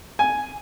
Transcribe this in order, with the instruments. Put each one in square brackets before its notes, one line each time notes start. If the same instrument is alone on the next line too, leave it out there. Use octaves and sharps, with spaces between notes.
[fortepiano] G#5